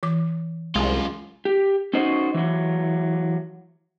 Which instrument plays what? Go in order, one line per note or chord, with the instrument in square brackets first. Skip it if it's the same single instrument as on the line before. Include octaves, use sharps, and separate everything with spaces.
[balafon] E3 D6
[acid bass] C2 [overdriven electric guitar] F#2 F4 [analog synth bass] G#3
[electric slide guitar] G4
C#4 D#4 F#4 C5 D#5
E3 F#3